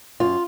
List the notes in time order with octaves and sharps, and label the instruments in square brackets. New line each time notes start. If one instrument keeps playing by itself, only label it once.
[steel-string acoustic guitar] F#2 F4